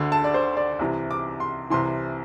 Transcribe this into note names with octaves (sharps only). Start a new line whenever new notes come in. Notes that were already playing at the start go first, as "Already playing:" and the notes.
Already playing: D2 D3
A5
D5
C5
D5
C2 C3 E3
D6
C6
C2 C3 E3 C6